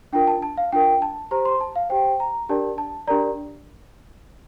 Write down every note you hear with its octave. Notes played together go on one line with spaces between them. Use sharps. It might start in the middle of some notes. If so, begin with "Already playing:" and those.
D4 F4 A#4 G5
A5
A5
F5
D4 F4 A#4 G5
A5
G4 C5 A#5
C6
A5
F5
G4 C5 G5
A#5
D4 G4 A#4 D5 A5
A5
D4 G4 A#4 D5 A#5